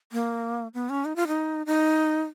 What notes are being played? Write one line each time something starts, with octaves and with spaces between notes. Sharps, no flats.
A#3
B3
C#4
D#4
F4
D#4
D#4